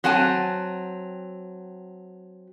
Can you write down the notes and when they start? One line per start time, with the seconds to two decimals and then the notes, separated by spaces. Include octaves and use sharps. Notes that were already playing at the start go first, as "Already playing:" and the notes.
0.04 F#3 C4 F#5 G#5 A5